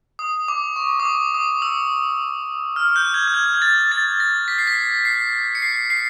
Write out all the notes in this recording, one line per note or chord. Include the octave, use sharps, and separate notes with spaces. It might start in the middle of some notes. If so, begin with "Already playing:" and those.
D#6
D6
C#6
D#6
D6
D#6
E6
F6
G6
G#6
G6
G#6
G#6
A6
A6
A#6
B6
C7
B6
C7
C#7
C7
C7